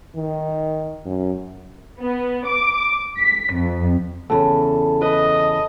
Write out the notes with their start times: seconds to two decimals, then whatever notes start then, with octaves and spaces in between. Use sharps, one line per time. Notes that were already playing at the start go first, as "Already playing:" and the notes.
0.15 D#3
1.05 F#2
2.01 B3
2.47 D6
3.19 B6
3.54 F2
4.30 E2 C#3 A4
5.02 B4 D#5